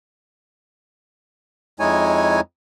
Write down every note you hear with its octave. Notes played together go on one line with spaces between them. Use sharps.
F2 G#3 D#4 E4 C#5 G#5